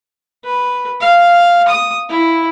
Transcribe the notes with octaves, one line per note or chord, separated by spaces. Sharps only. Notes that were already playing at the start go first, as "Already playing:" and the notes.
B4
F5
D#6
E4